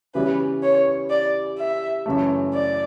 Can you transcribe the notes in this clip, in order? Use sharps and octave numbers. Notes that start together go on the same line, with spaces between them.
C#3 E3 G3 B3 B4
C#5
D5
E5
F#2 C#3 E3 A3
D5